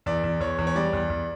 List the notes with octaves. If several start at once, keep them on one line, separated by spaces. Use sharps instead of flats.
E2 D5
E2
E2 C#5
E2
C#5
G3 D5
E2
E2